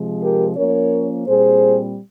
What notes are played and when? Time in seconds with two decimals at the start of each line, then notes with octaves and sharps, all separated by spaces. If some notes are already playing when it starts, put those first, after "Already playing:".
Already playing: C3 F3 G#3
0.21 G4 A#4
0.57 F3 A#3 C#4 A#4 C#5
1.28 A#2 G3 C4 G#4 C5